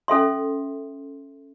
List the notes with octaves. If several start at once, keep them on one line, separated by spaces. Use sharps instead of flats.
C#4 A4 E5 C6